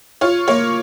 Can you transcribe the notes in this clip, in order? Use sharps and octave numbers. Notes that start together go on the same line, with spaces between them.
F4 C#5
A#3 C#5